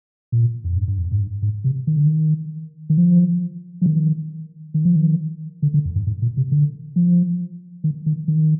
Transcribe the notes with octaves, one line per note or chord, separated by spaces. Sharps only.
A#2
F2
G2
G2
F2
G#2
G2
G#2
C3
D#3
D3
D#3
D#3
F3
F3
D#3
D#3
F3
D#3
D3
D3
F2
G2
G#2
A#2
C3
D3
F3
D#3
D#3
D#3